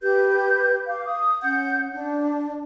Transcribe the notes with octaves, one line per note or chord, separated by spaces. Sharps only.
G4 B4 G6
F5 D6
D#6
C#4 F#5 G6
D4